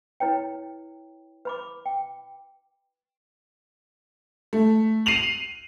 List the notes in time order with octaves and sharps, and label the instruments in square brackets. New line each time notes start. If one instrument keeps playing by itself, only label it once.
[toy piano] E4 B4 C#5 G5
B4 B5 D6
G5
[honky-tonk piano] A3
C7 D#7 F7 F#7